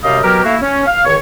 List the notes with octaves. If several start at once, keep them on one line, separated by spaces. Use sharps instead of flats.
F#2 C3 G3 D#5 F5
B2 F#3 G4 A#4
A3 A#3 E4 F#4 F5
C#4
F5
C#2 D#3 C#5